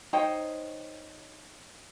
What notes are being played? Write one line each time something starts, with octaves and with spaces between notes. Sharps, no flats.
D#4 C5 C#5 G5